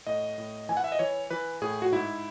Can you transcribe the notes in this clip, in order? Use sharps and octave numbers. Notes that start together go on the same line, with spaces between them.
A2 D#5
A2
E3 G#5
F#5
E5
D#5
E3 C#5
E3 B4
A2 G#4
F#4
G#2 E4